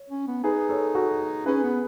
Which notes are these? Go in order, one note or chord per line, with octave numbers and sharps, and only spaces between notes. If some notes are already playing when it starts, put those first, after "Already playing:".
Already playing: C#5
C#4
B3
D#4 G#4 B4
A4 C#5
F#4 A4
C#4 G#4 B4
B3